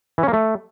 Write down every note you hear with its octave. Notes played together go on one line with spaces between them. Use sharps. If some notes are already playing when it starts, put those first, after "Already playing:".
E3
C#4
A#3
A3